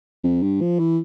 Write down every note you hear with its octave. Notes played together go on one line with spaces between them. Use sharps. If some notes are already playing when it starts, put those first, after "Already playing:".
F2
G2
F3
E3